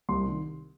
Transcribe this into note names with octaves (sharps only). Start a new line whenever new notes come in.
C2 C6
C3 D#3